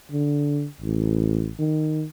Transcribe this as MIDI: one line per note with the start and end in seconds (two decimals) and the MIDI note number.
0.12 0.66 50
0.81 1.51 33
1.59 2.05 51